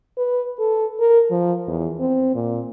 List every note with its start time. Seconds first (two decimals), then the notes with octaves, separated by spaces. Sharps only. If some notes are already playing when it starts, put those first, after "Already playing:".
0.17 B4
0.59 A4
1.00 A#4
1.31 F3
1.67 E2
1.99 C4
2.35 A#2